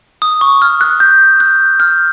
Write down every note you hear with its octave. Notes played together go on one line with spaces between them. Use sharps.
D#6
C#6
F6
F#6
G6
F#6
F6